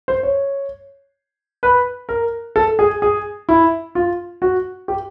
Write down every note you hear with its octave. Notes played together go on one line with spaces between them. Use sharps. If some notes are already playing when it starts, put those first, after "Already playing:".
C5
C#5
B4
A#4
A4
G#4
G#4
E4
F4
F#4
G4